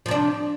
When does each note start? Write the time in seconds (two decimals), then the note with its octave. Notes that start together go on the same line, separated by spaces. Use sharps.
0.06 F3
0.08 C3
0.11 D4